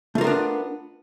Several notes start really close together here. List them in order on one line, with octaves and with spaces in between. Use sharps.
A3 F4 A#4 B3 D4